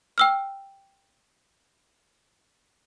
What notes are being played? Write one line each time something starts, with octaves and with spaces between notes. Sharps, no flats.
G5 E6 F6